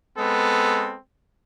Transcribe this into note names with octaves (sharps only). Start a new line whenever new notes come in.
G#3 B3 C4 A4